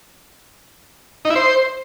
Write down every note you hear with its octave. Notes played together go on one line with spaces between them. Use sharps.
D#4
E4
C5